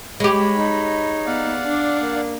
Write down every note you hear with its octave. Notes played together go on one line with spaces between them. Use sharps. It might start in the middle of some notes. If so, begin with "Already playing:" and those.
G#3 G4 C#5 B5
D#4
B3 D5 F5 F#5
D4
A#3